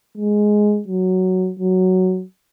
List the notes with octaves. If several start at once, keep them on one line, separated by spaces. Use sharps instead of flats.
G#3
F#3
F#3